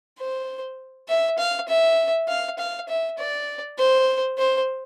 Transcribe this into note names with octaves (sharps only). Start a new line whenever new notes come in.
C5
E5
F5
E5
F5
F5
E5
D5
C5
C5